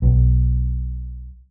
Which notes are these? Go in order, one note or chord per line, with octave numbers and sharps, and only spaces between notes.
B1